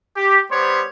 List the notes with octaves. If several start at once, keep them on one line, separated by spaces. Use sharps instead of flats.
G4
G3 B3 C5 C#5